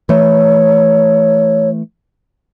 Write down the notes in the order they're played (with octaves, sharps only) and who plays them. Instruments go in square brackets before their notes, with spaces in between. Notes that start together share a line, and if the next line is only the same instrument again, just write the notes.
[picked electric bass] E3 A3 [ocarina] C#5